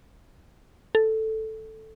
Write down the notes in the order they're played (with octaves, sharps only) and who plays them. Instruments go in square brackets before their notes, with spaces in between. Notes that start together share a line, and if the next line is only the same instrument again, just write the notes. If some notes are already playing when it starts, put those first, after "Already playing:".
[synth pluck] A4